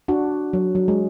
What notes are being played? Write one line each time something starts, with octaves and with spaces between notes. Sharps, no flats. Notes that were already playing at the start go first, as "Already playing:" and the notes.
D4 F#4
F#3
F#3
G#3